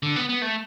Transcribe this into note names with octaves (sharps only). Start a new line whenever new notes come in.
D3
B3
B3
A3